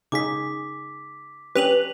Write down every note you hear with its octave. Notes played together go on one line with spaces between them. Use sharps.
C#3 D#4 G#4 D6 B6
C#4 D4 G4 B4 B6 F7 F#7